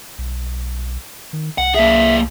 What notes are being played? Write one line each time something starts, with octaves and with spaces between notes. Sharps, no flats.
B1
D#3
C2 F#5
A#3 G#4 E5